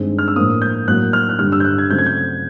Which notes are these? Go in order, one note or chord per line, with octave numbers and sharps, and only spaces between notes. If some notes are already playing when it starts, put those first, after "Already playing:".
Already playing: G2 D#3 G#3 C4
F6
E6
A2 F3 A#3 D#6
G6
A2 F#3 A#3 F#6
F6
F#6
G2 D3 G3 F6
E6
G6
F#6
G#6
C#3 F#3 A3 C4 G6
G#6
G6